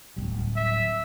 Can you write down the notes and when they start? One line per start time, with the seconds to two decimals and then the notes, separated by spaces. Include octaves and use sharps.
0.17 D1 B1 G3
0.56 E5